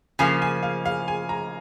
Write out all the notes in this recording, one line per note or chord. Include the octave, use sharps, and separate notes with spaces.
C#3 F3 A#3 G#5
G#5
F5
F5
G#5
A#5